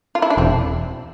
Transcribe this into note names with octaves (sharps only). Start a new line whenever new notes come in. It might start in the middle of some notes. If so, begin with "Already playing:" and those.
F4
E4
D4
E1 C4